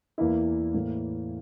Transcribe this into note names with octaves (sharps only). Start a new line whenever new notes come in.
E2 E3 A#3 E4
A2 E3 A#3